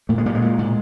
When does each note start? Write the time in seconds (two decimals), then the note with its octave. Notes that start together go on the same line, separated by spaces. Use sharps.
0.09 A#2 A3
0.18 G#3
0.25 A#2 G3
0.35 G#3
0.42 A#2
0.59 A#2